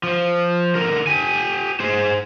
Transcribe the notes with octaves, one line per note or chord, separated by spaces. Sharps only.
F3
D3 A#4
G4 G#5
G#4 C5